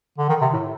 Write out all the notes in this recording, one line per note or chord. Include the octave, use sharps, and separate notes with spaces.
D3
D#3
C3
A2